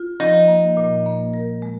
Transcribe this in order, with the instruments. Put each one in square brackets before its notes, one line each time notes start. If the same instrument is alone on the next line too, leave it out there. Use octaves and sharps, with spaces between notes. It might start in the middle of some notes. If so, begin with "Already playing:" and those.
Already playing: [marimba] F4
[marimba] F3 [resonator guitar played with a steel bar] D#4
[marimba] A#3
A#2
A#3
A#4
G#3